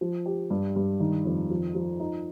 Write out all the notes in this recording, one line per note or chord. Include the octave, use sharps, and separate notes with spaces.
F3
G4
G2
G2
D#3
F2
F3
F3
D#4